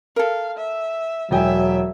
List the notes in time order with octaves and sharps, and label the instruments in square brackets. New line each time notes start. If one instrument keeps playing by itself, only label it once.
[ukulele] A4 A#4 [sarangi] F5
[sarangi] E5
[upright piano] E1 G5 G#5 [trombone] F#3 [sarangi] E5